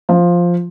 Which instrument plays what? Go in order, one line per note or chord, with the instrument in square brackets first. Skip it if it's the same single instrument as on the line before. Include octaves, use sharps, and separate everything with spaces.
[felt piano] F3